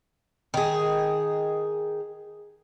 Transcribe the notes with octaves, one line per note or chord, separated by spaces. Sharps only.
D#3 G#4